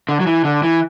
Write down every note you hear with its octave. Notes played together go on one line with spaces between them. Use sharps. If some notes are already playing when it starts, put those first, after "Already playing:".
D3
F#3
E3
D3
E3